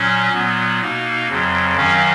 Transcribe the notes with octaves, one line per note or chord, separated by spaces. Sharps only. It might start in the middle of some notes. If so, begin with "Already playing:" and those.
Already playing: A#2 F#3 C#4
A#2 F#3 B3
B2 A#3 D#4
F2 C#3 F#3
F#2 D#3 F#3 C#4 F5